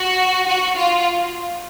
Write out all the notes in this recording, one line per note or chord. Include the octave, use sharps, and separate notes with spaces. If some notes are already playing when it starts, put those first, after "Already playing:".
Already playing: F#4
F#4
F4